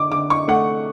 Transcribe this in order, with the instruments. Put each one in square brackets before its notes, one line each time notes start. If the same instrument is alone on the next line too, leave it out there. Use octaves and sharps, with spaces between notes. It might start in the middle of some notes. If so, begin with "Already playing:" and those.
Already playing: [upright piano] D3 D6
D3 D6
C#6
A3 F#5